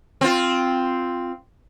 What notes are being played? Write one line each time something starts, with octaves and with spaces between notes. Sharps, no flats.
C4 F4